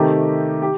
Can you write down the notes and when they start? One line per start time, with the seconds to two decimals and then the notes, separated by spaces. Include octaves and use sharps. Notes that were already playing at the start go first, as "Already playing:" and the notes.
Already playing: C3 D#3 A3 D#4 G4
0.62 G4